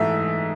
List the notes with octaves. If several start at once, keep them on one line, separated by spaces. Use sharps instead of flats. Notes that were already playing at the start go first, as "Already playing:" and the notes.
Already playing: G#2 E3 A3 E5